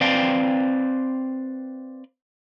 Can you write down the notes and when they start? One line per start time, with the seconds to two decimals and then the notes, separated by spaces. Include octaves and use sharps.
0.01 C4 B4 D5 F5 G5